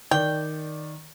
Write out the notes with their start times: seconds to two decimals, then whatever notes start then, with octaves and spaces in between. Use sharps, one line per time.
0.11 D#3 D5 G5